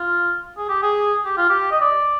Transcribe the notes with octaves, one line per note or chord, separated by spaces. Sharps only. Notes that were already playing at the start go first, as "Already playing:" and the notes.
Already playing: F4
G#4
G4
G#4
G4
F4
G4
D#5
D5